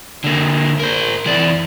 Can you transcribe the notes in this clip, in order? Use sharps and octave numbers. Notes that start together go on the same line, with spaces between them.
D3 A#3
A#4 C5
E3 D5